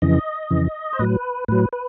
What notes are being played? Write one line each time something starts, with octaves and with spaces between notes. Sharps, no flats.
F2 C#3 E3 D#5
F2 C#3 E3
C5
A2 F#3 B4
A2 F#3 B4
B4